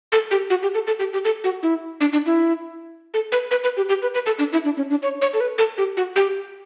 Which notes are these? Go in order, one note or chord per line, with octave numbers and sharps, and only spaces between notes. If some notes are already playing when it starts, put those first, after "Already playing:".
A4
G4
F#4
G4
A4
A4
G4
G4
A4
F#4
E4
D4
D4
E4
A4
B4
B4
B4
G4
G4
B4
B4
A4
D4
E4
D4
C#4
D4
C#5
C#5
A4
B4
A4
G4
F#4
G4